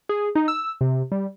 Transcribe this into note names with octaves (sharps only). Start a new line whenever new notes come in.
G#4
D#4
E6
C3
G3